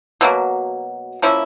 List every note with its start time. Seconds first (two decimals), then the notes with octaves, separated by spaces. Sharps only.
0.21 B2 F#3 A#3
1.22 F3 A#3 C#4 E4